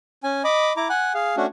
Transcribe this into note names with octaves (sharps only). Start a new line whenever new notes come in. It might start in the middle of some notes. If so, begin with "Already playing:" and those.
C#4 G#5
D#5 B5 D6
E4 A#5 D6
F#5 G#5 F#6
G#4 F5
A3 C#4 D4 F#4